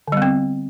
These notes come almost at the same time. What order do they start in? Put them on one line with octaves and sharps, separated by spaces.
D3 G3 B3 C4